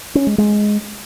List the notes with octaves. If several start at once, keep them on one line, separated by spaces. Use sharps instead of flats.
C#4
G#3
G#3